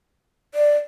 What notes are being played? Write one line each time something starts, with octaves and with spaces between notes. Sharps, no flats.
D5